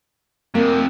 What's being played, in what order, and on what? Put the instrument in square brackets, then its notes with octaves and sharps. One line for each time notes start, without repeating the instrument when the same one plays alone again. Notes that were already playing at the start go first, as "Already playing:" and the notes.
[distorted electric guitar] F2 C3 [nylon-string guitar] A#3